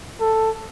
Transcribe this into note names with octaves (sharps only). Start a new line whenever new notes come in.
A4